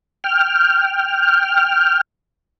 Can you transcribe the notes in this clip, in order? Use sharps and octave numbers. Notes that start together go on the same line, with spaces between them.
G5 F6